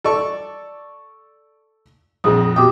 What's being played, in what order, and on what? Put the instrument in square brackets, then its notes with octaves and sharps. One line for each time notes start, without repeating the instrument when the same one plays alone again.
[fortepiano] A4 D5 C#6
[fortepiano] A#1 F2 [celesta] G#4 D#6
[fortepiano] B2 G5 [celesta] G4 D6 D#6